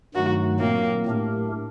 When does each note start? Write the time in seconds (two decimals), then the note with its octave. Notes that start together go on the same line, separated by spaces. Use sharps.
0.15 G2 D#3 F#3 A3 D#4 F#4
0.60 A#2 F#3 A#3 C4
1.06 A2 A3 D4 G4 A#4